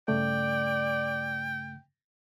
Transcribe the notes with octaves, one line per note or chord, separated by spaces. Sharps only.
G2 C#3 A3 D5 G5